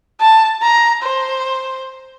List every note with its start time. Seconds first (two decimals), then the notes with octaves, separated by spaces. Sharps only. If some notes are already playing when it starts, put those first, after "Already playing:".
0.21 A5
0.62 A#5
1.03 C5